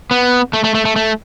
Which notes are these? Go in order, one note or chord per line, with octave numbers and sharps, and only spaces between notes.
B3
A3
A3
A3
A3
A3